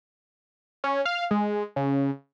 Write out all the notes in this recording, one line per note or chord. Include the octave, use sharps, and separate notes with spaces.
C#4
F5
G#3
C#3